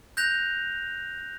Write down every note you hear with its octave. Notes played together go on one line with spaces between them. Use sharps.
F#6 G6 A#6 F7